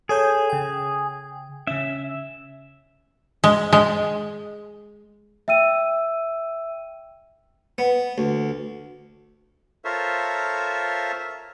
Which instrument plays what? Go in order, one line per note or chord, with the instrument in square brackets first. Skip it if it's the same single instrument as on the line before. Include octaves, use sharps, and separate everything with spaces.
[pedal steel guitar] G#4 [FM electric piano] A4 C#5 G6
[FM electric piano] C#3 G5
[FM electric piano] C#3 C#4 [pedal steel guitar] E5
[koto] G#3
G#3
[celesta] E5 G5 E6 D#7
[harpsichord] B3
D2
[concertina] F4 A4 A#4 C5 C#5 E5